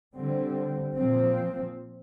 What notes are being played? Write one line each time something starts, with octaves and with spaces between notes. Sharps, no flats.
D3 G3 C4
A#2 F3 C4